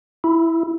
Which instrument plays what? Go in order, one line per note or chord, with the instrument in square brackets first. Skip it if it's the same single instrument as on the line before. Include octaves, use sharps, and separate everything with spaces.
[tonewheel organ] E4